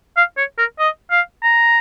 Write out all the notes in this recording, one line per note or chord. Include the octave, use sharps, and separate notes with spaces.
F5
C#5
A#4
D#5
F5
A#5